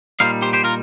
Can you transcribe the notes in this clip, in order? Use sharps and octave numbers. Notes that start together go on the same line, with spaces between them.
A#2 G3 D#4 C5 F5
G4 C5
G4 C5
F4 A#4